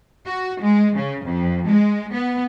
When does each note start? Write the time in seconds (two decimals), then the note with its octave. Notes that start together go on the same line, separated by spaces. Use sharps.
0.26 F#4
0.61 G#3
0.96 C#3
1.24 F2
1.66 G#3
2.14 B3